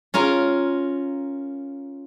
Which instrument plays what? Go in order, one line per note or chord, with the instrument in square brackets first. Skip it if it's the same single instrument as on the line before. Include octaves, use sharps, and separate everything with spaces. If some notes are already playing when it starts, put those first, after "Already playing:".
[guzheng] C#4 F4 A#4 A#5